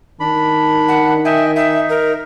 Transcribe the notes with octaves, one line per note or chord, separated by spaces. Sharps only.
D#3 D4 B5
F#5
D#5 E5 G5 G#5
D#4 E5
A#4